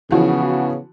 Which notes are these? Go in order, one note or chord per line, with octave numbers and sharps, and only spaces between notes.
C#3 E3 F3 B3 F#4